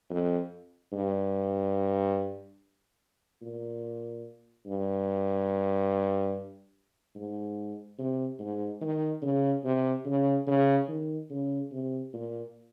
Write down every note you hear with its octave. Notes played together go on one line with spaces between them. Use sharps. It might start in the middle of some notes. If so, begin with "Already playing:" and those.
F2
G2
A#2
G2
G#2
C3
G#2
D#3
C#3
C3
C#3
C#3
D#3
C#3
C3
A#2